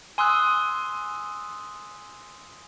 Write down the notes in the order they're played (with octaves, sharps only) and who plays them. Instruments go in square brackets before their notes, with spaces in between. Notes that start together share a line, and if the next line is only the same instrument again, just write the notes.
[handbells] G#5 C6 D#6 E6 F#6